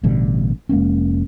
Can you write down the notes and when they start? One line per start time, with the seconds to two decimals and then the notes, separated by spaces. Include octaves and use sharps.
0.03 A1 B2 D3 G3
0.69 F1 G#3 A#3 C#4